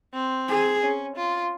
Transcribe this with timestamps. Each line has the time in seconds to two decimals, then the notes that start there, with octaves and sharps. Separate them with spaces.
0.14 C4
0.48 G#4
0.82 C#4
1.16 F4